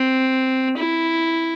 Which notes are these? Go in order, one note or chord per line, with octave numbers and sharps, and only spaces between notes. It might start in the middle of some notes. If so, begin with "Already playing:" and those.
Already playing: C4
E4